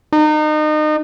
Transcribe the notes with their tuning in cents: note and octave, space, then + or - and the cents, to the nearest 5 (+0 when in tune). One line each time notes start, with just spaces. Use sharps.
D#4 -30